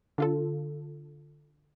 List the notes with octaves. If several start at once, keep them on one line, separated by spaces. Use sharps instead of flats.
D3 F4 A4